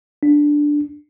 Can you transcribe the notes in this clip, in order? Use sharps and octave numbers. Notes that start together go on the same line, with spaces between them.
D4